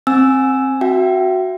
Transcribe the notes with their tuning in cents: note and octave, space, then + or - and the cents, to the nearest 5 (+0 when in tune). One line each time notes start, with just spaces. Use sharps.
C4 +10 G#5 +0 E6 +0
F#4 +0 E5 +30 G5 -40